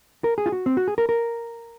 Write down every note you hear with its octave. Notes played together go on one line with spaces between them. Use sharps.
A#4
G#4
F4
F#4
C4
F#4
G#4
A#4
A#4